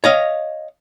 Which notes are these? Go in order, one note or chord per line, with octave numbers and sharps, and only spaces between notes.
C#5 D#5 F5